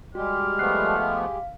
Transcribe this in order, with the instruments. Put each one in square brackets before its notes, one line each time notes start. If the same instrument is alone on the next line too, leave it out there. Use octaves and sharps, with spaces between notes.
[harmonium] G3 G#3 G4 [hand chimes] F#4 [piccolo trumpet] F6
[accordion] F3 A3 B3 [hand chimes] F#6 C7
[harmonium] G#3 G4 [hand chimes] F5